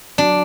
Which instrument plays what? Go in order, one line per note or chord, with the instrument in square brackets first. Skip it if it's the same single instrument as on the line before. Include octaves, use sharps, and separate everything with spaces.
[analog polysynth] F#3 [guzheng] D4